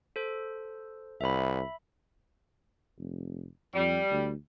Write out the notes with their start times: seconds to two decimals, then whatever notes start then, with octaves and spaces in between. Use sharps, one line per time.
0.16 A4 C5
1.21 C2 E5 B5
2.98 F1
3.75 F2 G3
4.11 D2